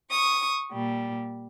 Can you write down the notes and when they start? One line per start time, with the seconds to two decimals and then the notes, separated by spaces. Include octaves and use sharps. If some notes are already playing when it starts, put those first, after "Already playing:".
0.11 C#6 D#6
0.72 A#2 G3